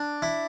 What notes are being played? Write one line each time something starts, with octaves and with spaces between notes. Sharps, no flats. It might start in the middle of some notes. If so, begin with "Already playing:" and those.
Already playing: D4
E4